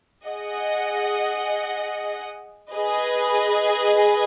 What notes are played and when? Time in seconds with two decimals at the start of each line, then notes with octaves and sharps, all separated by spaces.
0.24 G#4 D#5 F#5
2.70 G#4 B4 D#5